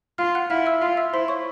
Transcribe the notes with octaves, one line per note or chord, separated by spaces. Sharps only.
F4 F5 F6
F#5 F#6
E4 F5 F6
E5 E6
F4 F5 F6
E5 E6
E4 C5 C6
C#5 C#6